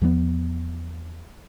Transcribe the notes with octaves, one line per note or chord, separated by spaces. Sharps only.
E2 F3 G3 B3